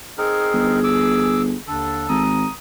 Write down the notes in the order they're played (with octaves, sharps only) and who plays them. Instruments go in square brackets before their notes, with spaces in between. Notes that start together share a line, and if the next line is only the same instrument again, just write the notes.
[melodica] C4 D#4 A#4 [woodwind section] G#4
[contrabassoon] G1
[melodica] D6 E6
[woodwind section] D#2 D3 D4 [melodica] A4
[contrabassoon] G#1 [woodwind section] A#5 D#6